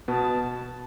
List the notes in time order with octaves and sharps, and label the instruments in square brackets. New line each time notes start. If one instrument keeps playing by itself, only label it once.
[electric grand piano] B2 B3 [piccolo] A5